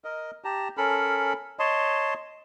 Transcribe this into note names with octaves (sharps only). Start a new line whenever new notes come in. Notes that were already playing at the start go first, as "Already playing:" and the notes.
A#4 D#5
G4 A5 A#5
C#4 A4 A#4 B5
C#5 D#5 A5 C6